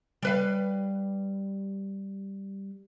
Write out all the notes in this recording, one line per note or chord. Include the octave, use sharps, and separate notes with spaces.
G3 B4 F5